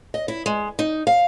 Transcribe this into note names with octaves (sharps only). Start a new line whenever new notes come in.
D#5
E4
G#3
D#4
F5